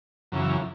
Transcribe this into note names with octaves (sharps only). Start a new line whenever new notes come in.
F#2 C#3 E3